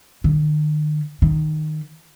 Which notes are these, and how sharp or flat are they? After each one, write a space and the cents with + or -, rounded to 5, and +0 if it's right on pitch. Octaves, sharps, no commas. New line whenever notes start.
D#3 -45
D#3 -10